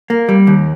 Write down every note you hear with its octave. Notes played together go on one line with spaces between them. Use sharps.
A#3
G3
D#2